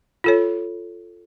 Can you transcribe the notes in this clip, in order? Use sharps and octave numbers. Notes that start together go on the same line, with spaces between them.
F4 A4 C#5